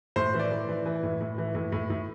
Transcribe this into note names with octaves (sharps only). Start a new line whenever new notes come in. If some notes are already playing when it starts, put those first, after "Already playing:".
A2 C5
E3
D5
E3
E3
E3
A2
A2
E3
A2
A2
A2